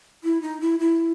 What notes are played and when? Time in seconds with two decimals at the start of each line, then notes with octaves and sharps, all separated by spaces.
0.24 E4
0.42 D#4
0.61 E4
0.79 E4